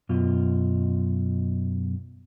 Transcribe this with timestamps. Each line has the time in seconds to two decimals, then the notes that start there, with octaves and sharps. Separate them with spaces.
0.09 F#2 B2 F4